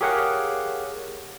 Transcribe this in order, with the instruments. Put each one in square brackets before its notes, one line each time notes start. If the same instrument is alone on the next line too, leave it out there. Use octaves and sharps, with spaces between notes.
[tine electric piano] G4 G#4 A#4 C#5 F5 F#5